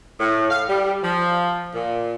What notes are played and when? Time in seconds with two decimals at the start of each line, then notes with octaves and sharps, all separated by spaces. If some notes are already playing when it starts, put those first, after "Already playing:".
0.19 A2
0.50 F5
0.69 G3
1.03 F3
1.75 A#2